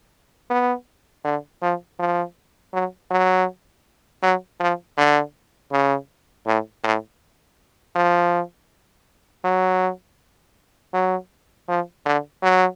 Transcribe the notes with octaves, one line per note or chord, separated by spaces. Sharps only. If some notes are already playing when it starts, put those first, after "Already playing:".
B3
D3
F3
F3
F#3
F#3
F#3
F3
D3
C#3
A2
A2
F3
F#3
F#3
F3
D3
F#3